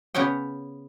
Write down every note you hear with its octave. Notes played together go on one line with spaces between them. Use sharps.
C#3 B3 C#4 C#5 G5